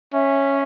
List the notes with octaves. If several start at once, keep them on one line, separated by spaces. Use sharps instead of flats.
C#4 E5